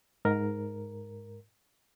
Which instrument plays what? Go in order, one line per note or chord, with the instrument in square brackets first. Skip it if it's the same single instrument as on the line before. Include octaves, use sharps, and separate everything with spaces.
[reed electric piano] G#2 A#4